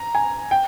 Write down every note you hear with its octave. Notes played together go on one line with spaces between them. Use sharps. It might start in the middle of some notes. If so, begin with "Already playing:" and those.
Already playing: A#5
G#5
G5